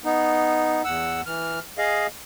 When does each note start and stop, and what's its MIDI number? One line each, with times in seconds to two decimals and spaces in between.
0.04 0.82 59
0.04 0.82 63
0.85 1.21 40
0.85 1.21 78
0.85 1.21 88
1.26 1.59 52
1.26 1.59 89
1.78 2.07 68
1.78 2.07 75
1.78 2.07 77